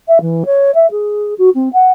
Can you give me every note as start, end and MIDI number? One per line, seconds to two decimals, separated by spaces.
0.08 0.19 76
0.21 0.43 52
0.46 0.71 73
0.75 0.90 76
0.91 1.34 68
1.38 1.50 66
1.55 1.69 60
1.73 1.92 78